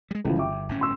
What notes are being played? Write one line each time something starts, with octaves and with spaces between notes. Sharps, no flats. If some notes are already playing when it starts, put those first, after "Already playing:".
G3 G#3
G1 C#2 E3 F3
E5 G5 D6
G1 A2 C#4
C6 E6